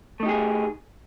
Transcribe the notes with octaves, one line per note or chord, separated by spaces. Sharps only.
A3 D#4 G4 G#4